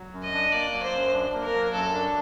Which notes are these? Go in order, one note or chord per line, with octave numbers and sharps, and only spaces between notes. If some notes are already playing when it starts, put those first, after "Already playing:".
Already playing: F#3
F#2
D#5
D4
A#3 D5
F#3
C5
F#2
D4
A#3
A#4
F#3
F#2 A4
D4